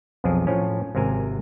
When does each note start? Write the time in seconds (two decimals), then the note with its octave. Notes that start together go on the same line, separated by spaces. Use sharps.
0.24 B1 F2 F3 G#4
0.47 A2 F3 C#4
0.95 G#1 C3 A#4 G#5